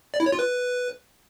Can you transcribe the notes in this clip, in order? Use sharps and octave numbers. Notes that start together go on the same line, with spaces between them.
D5
E4
C#5
F4
B4